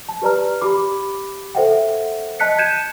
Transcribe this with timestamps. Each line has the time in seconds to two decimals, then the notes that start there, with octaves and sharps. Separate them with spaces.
0.09 A5
0.22 G4 B4 D5 A#5 F6
0.61 G4 B5 D6
1.55 A4 C5 E5 F#5 G5
2.40 D#5 A5 F#6 B6 C#7
2.58 A5 G6 G#6 C#7 D#7 E7